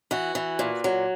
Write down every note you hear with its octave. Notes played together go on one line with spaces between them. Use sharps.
E3 F#4
E3
A#2
F#3